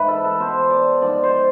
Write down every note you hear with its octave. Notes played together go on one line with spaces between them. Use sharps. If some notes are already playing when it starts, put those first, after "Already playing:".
Already playing: G#2 E3 B4
A4
A4
B2 C5
D5
G#2 F3 D5
C5